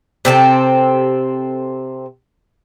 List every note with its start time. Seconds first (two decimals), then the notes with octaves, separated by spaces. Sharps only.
0.25 C3 C4 E4 A4